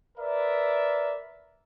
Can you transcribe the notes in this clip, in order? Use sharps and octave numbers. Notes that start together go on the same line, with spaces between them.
A#4 B4 D5 E5